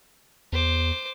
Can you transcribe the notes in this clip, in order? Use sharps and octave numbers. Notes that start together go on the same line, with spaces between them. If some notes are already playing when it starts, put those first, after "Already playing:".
E2 C5 D6